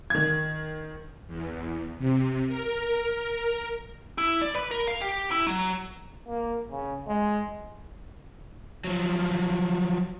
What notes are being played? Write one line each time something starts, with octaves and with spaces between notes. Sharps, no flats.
D#3 G#6
E2
C3
A#4
E4
D5
B4
A#4
F5
G4
E4
F#3
A#3
C#3
G#3
F3 F#3